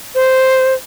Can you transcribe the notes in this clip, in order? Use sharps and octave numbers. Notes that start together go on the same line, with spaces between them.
C5